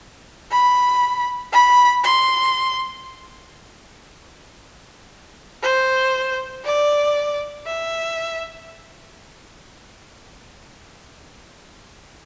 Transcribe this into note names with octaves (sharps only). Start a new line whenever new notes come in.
B5
B5
C6
C5
D5
E5